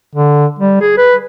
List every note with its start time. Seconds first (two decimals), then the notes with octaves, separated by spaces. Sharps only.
0.15 D3
0.59 G3
0.81 G#4
0.98 B4